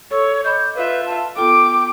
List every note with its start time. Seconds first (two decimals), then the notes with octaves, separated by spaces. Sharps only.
0.11 A4 C#5 C#6 E6
0.44 D#5 B5 D6 G6
0.76 F4 B4 E5
1.06 A5
1.37 B3 F4 A4 G5 D6